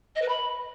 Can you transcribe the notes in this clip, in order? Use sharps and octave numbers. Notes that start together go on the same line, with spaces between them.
D#5
B4
B5